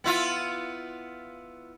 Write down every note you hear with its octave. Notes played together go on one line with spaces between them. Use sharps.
B3 E4 F4